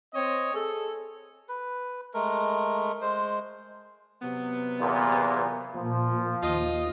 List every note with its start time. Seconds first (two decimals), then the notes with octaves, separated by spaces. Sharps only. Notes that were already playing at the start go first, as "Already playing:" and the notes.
0.13 C4 C#5 D#5
0.54 G#4 A4
1.49 B4
2.14 G#3 A3 A#4
3.01 G#3 C5
4.22 C3 F#3 B3
4.80 E2 A#2
5.74 A#2 F3
6.43 D#2 F4 D#5